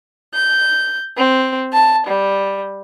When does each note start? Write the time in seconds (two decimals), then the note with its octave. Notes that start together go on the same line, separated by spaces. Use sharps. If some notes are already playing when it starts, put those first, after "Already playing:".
0.35 G6
1.18 C4
1.73 A5
2.07 G3